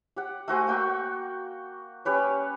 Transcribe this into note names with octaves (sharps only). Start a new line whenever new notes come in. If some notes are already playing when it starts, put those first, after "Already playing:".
G4 F#5
A3 F#4 C5 G#5
A#3 F#4 G5 C#6
C#4 G4 B4 C#5